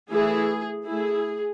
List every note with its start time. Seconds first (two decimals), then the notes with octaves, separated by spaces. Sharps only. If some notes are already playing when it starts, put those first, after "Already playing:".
0.12 E3 A3 E4 G#4
0.87 A3 E4 G#4